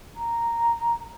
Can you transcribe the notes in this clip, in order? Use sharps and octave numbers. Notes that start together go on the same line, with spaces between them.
A#5